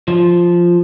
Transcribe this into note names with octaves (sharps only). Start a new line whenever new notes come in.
F3